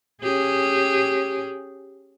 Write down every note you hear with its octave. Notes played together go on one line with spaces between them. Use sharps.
C#4 G4 G#4